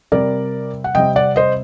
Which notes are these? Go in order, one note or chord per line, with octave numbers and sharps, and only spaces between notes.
C3 G3 C4 A#4 D5
F#5
C3 G3 C4 D#5 G5
D5 F#5
C5 D#5